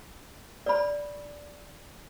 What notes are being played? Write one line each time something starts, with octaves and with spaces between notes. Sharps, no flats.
D5 B5